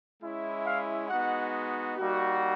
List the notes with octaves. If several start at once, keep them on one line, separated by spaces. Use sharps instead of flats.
G#3 C#4 E4
F5
G#3 B3 D#4 F#4 F#5
G3 A#3 D#4 F#4